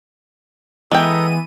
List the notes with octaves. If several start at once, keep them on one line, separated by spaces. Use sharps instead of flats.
E3 G#3 B3 A4 G5 A#5 D#6 D#7